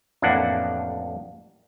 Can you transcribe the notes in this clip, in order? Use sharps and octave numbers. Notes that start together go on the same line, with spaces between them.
A1 F2 A#3 D4 E4 F#5